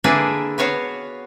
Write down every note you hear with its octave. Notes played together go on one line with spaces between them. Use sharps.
D3 A#3 D4 E4 G#4 B4
B3 F#4 C#5 F5